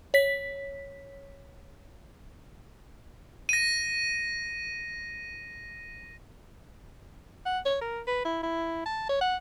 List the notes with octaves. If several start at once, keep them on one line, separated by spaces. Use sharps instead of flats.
C#5 B6
A#6 D#7
F#5
C#5
A#4
B4
E4
E4
A5
C#5
F#5